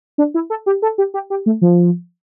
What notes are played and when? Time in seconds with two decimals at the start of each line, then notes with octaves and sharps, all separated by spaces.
0.18 D4
0.34 E4
0.50 A4
0.66 G4
0.82 A4
0.98 G4
1.14 G4
1.30 G4
1.46 A3
1.62 F3